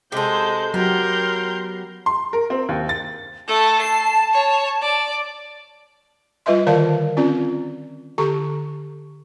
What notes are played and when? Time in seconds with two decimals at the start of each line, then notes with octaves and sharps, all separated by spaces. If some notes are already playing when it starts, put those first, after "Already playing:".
0.12 C3 G#3 A4 C5 G6
0.74 F#3 B3 F#4 G4 A#4 C6 G6
2.06 C6
2.33 A#4
2.50 C4
2.69 D#2
2.89 A6
3.48 A3 A4 A5
3.81 C7
4.33 C#5
4.82 D5
6.46 G3 F4 B4 D#5 E5 C6
6.67 D3 D#3 A#4 D5 F5 A5
7.17 C4 C#4 F4 D5
8.18 D3 G4 A4 A#5 C#6